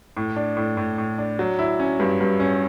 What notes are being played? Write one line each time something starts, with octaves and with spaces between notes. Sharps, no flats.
A2
D4
A2
A2
A2
D4
F#3
E4
C#4
G2
G2
C#4